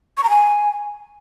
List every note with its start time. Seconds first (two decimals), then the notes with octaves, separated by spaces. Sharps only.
0.17 C#6
0.23 A#5
0.30 G#5